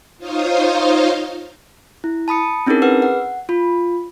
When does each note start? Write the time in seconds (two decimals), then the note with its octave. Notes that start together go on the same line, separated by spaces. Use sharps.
0.18 D#4 F4 C5 C#5 D#5 F5
2.04 E4
2.28 A5 B5 D#6 C#7
2.66 C4 C#4 D#4 E4 G#4 A#4
2.82 G#4 B4 F#5 E6
3.02 F#5
3.49 F4 B5